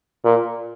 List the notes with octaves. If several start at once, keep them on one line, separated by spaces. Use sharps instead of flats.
A#2